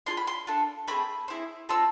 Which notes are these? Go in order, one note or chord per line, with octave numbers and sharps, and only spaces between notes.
D4 F4 G#4 C6
B5
C6
D4 F4 A4
A3 C4 G#4 B5
C4 E4 G#4
C4 F4 A4 E6